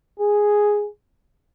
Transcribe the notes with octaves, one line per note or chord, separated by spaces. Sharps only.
G#4